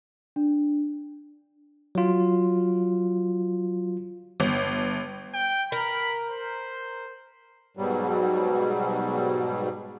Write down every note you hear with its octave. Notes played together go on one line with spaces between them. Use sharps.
D4
F#3 F4
G1
G5
A#4 B5
C5
G#2 B2 F#3 G3